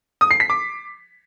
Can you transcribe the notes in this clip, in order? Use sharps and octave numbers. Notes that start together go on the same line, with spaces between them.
D#6
C7
B6
D6